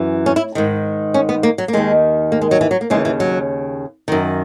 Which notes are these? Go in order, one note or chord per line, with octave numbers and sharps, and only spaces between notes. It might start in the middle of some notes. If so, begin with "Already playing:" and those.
Already playing: F#2 E3
C#4
E4
G#2 D#3
C#4
B3
A#3
F#3
A#3
D#2 D#3 G#3
A#3
G#3
F#3
E3
F#3
A#3
D#2 C#3 E3 G#3
E3
F#3
F#2 D#3